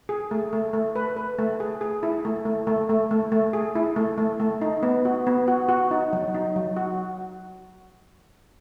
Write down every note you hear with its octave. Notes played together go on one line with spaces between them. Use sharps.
G#4
A3
A3
A3
B4
B4
A3
G#4
G#4
E4
A3
A3
A3
A3
A3
A3
G#4
E4
A3
A3
A3
D#4
B3
F#4
B3
F#4
F#4
D#4
F#3
D#4
F#3
F#4